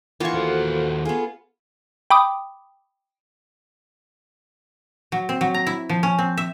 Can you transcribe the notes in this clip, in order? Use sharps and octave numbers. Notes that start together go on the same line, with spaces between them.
E3 A#3 B3 F4 C#6
D#2 F#4 A4 C5 F#5
B3 F4 G#4 A4
G5 B5 D6 D#6
F#3
C4
F#3
A#5
E4
F3
C#4
C4
E5